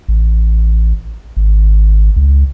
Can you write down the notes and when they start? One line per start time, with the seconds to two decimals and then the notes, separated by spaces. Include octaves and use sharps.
0.08 A1
1.37 G#1
2.16 C#2